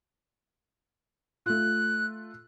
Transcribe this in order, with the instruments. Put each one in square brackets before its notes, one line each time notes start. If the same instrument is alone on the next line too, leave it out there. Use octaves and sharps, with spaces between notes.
[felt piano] A3 F4 [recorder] F#6